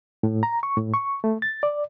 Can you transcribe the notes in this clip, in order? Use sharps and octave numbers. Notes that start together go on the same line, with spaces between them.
A2
A#5
C#6
A2
C#6
A3
A6
D5